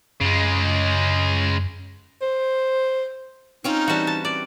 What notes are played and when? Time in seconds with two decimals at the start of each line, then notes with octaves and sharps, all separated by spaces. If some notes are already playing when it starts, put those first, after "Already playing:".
0.21 F#2 C#3 G#3
2.21 C5
3.64 C4 C#4 D#4 F4
3.88 E3 G3 F#4 A5
4.07 A5
4.25 D5